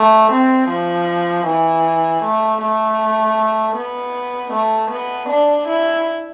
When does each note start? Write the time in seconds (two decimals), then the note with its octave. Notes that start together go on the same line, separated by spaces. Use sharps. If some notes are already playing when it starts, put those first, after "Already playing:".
Already playing: A3
0.32 C4
0.69 F3
1.46 E3
2.24 A3
2.61 A3
3.76 B3
4.53 A3
4.91 B3
5.29 D4
5.68 E4